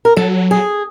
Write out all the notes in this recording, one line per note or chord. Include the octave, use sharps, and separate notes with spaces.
A#4
F#3 A4
G#4